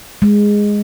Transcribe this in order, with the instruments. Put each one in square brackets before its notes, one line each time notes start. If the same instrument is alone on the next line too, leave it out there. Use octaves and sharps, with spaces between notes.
[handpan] G#3